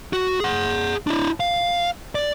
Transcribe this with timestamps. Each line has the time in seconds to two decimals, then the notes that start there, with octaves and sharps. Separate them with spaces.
0.13 F#4
0.40 G#4 F#5
1.07 D4 E4
1.40 F5
2.15 D5